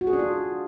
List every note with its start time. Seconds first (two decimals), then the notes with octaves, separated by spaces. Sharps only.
0.01 F#4
0.07 G#4
0.13 D4
0.19 F4